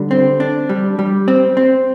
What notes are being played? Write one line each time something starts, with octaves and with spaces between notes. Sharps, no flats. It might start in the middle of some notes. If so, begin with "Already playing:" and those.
Already playing: D3 G3
C4
D4
G3
G3
C4
C4